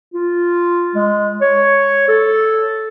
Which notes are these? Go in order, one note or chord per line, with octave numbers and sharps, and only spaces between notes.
F4
G#3
C#5
A4